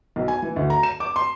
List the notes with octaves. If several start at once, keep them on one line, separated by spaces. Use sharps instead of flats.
B1
G#5
E3
D2
A#5
E7
D6
C6